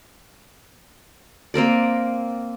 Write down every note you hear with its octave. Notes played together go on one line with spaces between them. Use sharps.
A#3 C4 A#4 D5